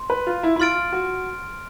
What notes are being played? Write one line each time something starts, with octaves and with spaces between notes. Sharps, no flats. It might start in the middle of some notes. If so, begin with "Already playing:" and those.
Already playing: C6
B4
F4
E4
E4
F4 C6 F6 A6 D7
F#4